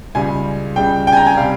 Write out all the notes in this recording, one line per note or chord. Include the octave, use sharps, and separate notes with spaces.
C#2 C#3 G3 G#5
C#2 C#3 G3 G5
G5
G#5
A#5
G#5
C3 G3 F5